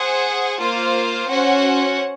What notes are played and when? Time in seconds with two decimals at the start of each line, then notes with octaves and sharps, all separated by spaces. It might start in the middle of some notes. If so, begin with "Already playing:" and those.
Already playing: G#4 C5 F#5
0.60 A#3 F4 C5 F5
1.29 C#4 F#4 C5 F#5